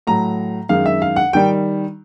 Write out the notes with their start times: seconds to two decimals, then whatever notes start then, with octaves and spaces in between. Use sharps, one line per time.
0.07 A2 F#3 A#5
0.69 F#2 D#3 G#3 F5
0.86 E5
1.02 F5
1.16 F#5
1.33 D#3 G3 G5